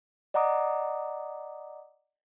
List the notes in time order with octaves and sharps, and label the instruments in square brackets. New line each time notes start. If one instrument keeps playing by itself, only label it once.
[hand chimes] D5 D#5 F#5 A#5 D6 D#6